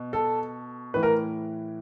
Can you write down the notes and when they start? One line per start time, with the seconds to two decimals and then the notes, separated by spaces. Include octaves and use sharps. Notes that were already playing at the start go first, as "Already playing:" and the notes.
Already playing: B2
0.13 A4
0.94 A2 E3 B4
1.03 A#4